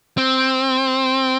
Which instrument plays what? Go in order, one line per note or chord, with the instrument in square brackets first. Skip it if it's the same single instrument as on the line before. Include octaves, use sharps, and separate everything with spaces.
[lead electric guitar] C4